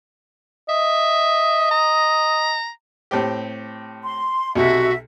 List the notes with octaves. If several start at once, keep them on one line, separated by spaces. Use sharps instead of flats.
D#5 E5
A#5
A2 C4 G4
C6
B1 C3 F#4 E5